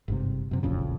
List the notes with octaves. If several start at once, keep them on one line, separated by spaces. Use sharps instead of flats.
G1 G#2 C3
F#2 C3
E1 A#1 F2 C#3